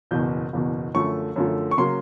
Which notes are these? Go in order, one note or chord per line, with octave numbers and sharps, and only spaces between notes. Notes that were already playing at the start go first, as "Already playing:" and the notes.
F#1 E2 B2 G6
F#1 E2 B2
F#2 D3 F3 A3 C#6
F#2 D3 F3 A3
C#6
C#3 F#3 A#3 C6